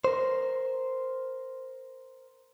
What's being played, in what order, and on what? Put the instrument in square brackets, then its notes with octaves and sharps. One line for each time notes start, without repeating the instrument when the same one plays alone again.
[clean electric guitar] A#4 C5